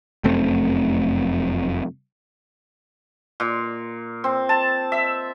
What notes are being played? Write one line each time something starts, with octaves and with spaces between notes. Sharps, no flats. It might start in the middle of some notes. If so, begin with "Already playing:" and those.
F1 F#2 A3 C4
A#2
C4
A5
E5